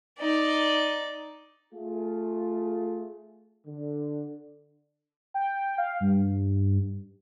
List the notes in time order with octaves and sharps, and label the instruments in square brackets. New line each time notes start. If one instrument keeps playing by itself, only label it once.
[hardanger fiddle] D#4 D5
[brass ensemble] A3 F4 G#4
D3
[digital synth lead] G5
F5
G2